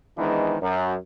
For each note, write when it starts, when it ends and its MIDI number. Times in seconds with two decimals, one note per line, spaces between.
0.17 0.57 44
0.17 0.57 51
0.17 0.57 52
0.17 0.57 56
0.17 0.57 59
0.17 0.57 62
0.61 0.95 42